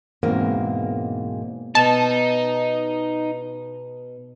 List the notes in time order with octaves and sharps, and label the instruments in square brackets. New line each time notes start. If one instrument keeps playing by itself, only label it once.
[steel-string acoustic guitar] E2 G#2 B2 G#3 A#3 C4
[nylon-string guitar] B2 [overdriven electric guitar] D#4 [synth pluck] A5